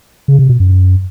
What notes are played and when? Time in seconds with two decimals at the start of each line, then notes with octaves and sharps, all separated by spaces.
0.28 C#3
0.39 C3
0.49 B2
0.60 F#2